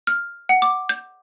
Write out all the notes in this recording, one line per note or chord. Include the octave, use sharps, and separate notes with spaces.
F6
F#5
D6
G6